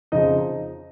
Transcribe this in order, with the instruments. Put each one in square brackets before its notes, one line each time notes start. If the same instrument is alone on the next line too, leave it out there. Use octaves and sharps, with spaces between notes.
[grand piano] F2 C#3 F3 D#4 D#5